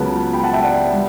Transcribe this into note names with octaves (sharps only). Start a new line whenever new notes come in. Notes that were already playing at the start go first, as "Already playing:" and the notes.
Already playing: C#2 C#3 F#3 B3 A5
G5 B5
F#5 A5
E5 G5
D5 F#5
G3